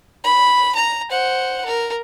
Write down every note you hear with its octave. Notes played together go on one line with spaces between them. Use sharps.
B5
A#5
C5 F#5
A#4